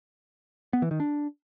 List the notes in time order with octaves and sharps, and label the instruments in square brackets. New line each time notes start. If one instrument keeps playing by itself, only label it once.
[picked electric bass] B3
E3
D#3
D4